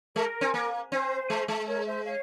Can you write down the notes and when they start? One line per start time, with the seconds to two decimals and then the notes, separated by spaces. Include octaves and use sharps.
0.16 G#3 A#4
0.41 C4
0.54 A#3
0.91 C4 C5
1.30 G#3
1.48 G#3
1.68 A#4 C#5
1.86 C5 E5
2.05 C#5 F5